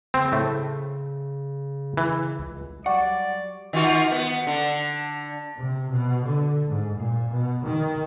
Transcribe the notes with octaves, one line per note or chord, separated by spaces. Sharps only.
C#3 C4
A2 A3
E3
C#2
F#3 G3 D5 F#5 C#6
D#3 F4 F#4
B3
D3
C3
B2
D3
G#2
A#2
B2
D#3